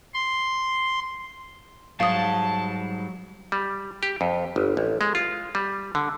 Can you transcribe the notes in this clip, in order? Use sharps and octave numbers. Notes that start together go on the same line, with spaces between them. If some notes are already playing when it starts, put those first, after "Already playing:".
C6
G#2 F#3 G3 F5 A5 D#6
G3
G4
F2
G1
A1
G#3
F4
G3
D3